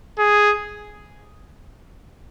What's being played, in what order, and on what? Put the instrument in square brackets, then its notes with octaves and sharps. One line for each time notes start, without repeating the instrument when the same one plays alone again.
[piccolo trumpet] G#4